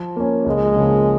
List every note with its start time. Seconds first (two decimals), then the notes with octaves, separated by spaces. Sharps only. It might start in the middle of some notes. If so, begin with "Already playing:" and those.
Already playing: F3
0.16 A#3 C#4
0.46 C#2 G#3
0.75 C#3 F3 A#3